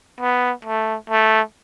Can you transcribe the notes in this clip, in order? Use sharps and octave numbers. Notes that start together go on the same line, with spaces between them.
B3
A3
A3